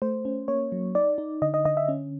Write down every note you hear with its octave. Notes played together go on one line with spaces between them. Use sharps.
A3 C5
C#4
A#3 C#5
F#3
D#4 D5
D#4
D3 D#5
D#5
D3 D#5
E5
C#4